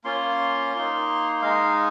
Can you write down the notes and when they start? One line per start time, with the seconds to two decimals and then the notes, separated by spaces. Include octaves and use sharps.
0.04 A#3 C#4 F4 C6
0.74 A#3 D#4
1.42 G#3 D#4 F5